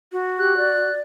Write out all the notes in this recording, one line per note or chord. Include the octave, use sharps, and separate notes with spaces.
F#4
G4 F#6
D5